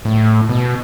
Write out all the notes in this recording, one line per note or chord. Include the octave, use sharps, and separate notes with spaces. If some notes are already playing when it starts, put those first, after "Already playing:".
A2
B2